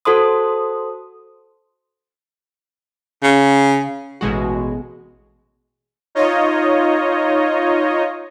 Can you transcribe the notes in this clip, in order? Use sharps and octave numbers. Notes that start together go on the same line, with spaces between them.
F#4 A4 C5 C6 D#6
C#3
A1 B2 G#3 F#4
D#4 F4 C#5 D#5